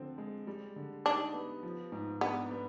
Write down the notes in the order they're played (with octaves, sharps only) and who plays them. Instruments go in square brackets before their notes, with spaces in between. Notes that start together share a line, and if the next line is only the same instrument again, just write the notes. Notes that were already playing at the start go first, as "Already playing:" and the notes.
Already playing: [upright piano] D3 F3 C4
G#3
G3
D3
[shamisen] D4 [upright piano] D#4
[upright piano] B3
F3
G#2
[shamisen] B3 [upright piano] D4
[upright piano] B3